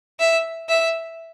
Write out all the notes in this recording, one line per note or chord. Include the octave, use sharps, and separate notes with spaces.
E5
E5